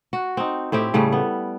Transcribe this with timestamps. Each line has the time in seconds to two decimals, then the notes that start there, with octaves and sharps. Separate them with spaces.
0.13 F#4
0.37 C4 D#4
0.72 A2 C4 E4 G4
0.94 A2 C#3 G3 A3
1.12 B3